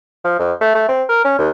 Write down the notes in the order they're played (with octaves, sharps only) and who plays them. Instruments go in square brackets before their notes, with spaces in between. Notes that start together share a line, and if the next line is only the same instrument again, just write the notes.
[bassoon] F3
F2
A3
A3
C4
A#4
C#4
D#2